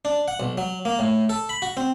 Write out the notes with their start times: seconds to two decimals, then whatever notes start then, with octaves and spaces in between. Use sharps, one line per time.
0.05 D4
0.28 F#5
0.40 B1
0.58 F#3
0.85 A#3
0.99 A2
1.29 A4
1.49 B5
1.62 F#4
1.77 C4